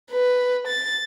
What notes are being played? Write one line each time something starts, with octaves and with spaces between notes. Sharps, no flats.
B4
A6